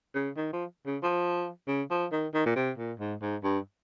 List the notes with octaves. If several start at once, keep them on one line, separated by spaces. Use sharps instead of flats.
C#3
D#3
F3
C#3
F3
C#3
F3
D#3
D#3
A#2
C3
A#2
G#2
G#2
G2